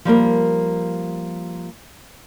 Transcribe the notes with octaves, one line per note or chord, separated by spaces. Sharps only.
F3 G3 A#3 A#4